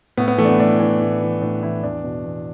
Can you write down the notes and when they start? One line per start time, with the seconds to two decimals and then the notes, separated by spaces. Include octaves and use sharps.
0.17 A2 B3
0.28 B3
0.38 E3 A3
0.45 D4
0.49 B3
0.59 A2 D4
0.80 E3
1.00 A2
1.21 E3
1.41 A2 D4
1.63 E3 E4
1.83 E2 D4
2.04 B2
2.25 E2